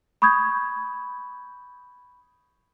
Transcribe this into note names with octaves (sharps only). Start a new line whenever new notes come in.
B5 C#6 D#6 G6 G#6